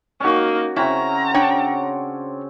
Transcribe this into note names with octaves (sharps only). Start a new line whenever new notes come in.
A#3 C#4 D#4 F#4
C#3 C4 C#4 E4 A#5
D4 C#5 G5